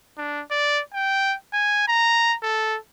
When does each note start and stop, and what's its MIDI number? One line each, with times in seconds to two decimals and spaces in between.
0.18 0.42 62
0.51 0.81 74
0.93 1.35 79
1.53 1.84 80
1.88 2.36 82
2.43 2.78 69